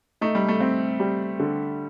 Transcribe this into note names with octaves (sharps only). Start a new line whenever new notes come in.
A3 D#4
G3
A3
C4
G3
D3